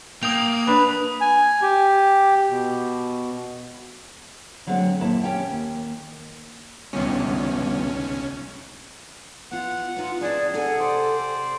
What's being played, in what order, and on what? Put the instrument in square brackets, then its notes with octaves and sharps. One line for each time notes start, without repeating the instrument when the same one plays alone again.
[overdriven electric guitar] A#3 [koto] G5 [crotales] D#6 F7
[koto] D4 [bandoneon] B4
[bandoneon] G#5
G4
B2
[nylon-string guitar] D3 F#3 G#3 A3 C4
D#2 A#2 E4 A#4 A5
C#4 G4 G5
D#2
[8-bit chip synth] C#2 C#4 [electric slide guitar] G2 B2 D#3
[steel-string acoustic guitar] B3 F4 [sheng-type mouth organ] F#5
[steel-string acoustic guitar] B3 D#4 [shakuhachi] F4
[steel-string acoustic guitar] C4 D#4 [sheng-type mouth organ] G#4 [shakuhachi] D5
[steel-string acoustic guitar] C3 F#5 G#5 [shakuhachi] A4
[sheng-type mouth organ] C5 D5